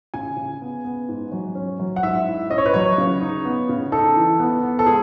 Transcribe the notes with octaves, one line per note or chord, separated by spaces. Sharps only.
C#3 G#5
C#3
B3
B3
G#2
F#3
C#4
F#3
F#5
G#2 E5
E4
C#4 D#5
C#5
B4
F#3 C#5
C#3
D#4
B3
C#3
D#4 A4
E3
B3
B3
A4
G#3 G#4